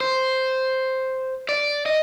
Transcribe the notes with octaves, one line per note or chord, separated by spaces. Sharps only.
C5
D5
D#5